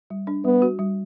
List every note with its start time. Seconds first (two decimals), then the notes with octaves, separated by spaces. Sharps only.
0.10 G3
0.27 D4
0.45 G3 B3
0.62 F#4
0.79 G3